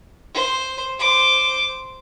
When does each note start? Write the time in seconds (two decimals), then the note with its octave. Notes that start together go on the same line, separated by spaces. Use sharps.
0.34 C5
0.99 C5 D6